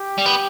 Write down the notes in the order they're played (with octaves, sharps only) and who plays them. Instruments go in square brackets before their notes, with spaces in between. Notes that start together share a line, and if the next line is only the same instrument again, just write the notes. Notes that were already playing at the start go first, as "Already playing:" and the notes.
Already playing: [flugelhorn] G4
[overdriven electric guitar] G3
B3